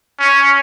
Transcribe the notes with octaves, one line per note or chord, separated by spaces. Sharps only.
C#4